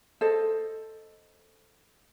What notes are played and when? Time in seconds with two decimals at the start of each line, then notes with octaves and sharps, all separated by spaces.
0.21 A4 C5 D#5